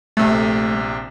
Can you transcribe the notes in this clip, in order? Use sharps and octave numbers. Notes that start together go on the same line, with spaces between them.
A#1 C3 A3